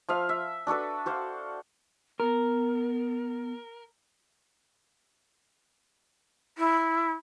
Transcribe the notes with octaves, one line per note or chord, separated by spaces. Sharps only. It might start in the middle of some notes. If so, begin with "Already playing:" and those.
F3 E5 F5
E5
D4 F#4 A4 B4
F#4 C5 F5 F#5
B3 A#4
E4